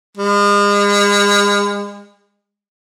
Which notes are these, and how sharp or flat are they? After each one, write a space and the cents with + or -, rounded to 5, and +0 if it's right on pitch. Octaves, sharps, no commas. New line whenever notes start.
G#3 -40